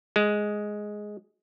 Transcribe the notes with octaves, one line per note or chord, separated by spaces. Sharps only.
G#3